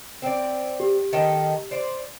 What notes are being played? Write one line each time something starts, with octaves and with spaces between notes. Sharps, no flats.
C4 D5
G4
D#3 A4 D#5
C5 D5